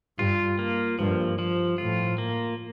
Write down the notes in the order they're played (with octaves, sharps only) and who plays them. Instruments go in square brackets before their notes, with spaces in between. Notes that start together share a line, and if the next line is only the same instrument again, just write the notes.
[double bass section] G2 [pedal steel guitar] F4
[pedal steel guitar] A#3
[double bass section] G2 [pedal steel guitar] F3
[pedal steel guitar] F3
[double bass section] A2 [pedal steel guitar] F4
[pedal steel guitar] A#3